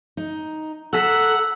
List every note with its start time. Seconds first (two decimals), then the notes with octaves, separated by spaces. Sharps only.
0.17 D#4
0.93 A4 F#5 G#5 A#5 E6 B6